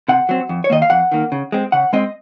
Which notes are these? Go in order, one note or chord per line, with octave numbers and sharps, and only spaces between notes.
C3 F#5
F#3 C4
F2
C#5
D#3 A#3 D#5
F5
F2 F#5
D#3 A#3
C#3
G#3 C4
C#3 F#5
G#3 C4 D#5